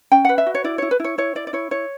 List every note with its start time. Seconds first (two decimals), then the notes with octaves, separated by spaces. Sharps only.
0.11 C#4 G5
0.25 B4 F#5
0.38 E5
0.46 F#4
0.55 C#5
0.64 E4 D5
0.78 E4 C#5
0.91 B4
1.00 E4 C#5
1.18 E4 C#5
1.35 E4 D5
1.47 D5
1.53 E4 C#5
1.71 E4 C#5